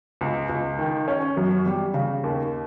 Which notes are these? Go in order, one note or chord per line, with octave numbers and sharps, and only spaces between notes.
C#2
C#2
D#3
C#4
F#2
G3
C#3
D#2